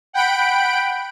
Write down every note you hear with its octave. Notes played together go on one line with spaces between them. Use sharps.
F#5 G5 B5 D7